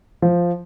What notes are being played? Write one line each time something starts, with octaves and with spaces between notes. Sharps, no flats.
F3